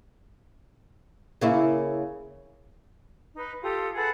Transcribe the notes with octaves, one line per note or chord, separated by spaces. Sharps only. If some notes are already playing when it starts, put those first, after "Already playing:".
C#3 A#3 E4
D#4 B4
F4 G4 A4 D#6
G#4 A4 B4 F#5